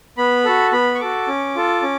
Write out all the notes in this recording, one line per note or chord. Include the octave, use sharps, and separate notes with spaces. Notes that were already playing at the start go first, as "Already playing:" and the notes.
B3 B5
F#4 A4
B3 B5
C#6
F#4 A4 D6
C#4
F4 A4
C#4